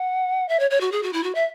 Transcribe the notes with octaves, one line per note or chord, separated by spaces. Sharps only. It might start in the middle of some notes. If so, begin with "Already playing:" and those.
Already playing: F#5
E5
C#5
C#5
F#4
G#4
F#4
E4
F#4
E5